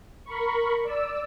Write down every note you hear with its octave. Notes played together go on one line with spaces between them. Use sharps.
A#4 B5 C#6
D5 E6